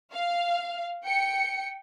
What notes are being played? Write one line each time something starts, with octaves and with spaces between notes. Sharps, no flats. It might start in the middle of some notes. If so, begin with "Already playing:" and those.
F5
G5 C#7